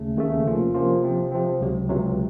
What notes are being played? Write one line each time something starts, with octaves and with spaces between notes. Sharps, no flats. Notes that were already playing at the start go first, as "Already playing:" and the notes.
Already playing: D#2 C#3 A3
D#2 C#3 A3
C3 F3 A#3 C#4 F4
C3 F3 A#3 C#4 F4
C3 F3 C4
C3 F3 C4
C#2 C3 F#3
C#2 C3 F#3